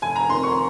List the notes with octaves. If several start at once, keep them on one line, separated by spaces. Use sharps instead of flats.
F1 G#5
A#5
F2 D#3 C6
C#6